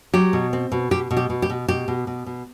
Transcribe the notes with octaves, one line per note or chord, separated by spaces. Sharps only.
F#3 G4
B2
C4
B2
B2 G4
B2
G4
B2
G4
B2
B2 G4
B2
B2
B2